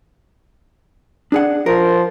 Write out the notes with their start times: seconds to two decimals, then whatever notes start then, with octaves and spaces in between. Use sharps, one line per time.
1.32 D4 G#4 F#5
1.66 F3 A#4